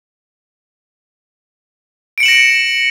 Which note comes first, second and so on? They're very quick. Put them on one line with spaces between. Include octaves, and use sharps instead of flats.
D7 C#7 F#7 E7 A#6